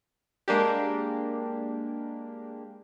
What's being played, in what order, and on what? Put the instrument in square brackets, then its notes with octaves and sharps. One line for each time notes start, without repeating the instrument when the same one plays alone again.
[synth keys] G#3 A#3 D4 G4